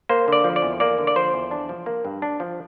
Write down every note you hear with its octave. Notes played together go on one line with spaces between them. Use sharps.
A#3 C5
D3 D5
F3
D5
E2
A#3 D5
D3
D5
F3 C5
E2
D4
F3
A#3
G2
D4
F3